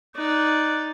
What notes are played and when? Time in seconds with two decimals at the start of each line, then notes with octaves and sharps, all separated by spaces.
0.16 D#4 D5 F#6